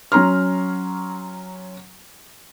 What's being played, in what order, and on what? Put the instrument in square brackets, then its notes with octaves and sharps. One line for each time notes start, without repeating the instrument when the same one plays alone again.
[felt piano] F#3 C#4 A#5 C6 F6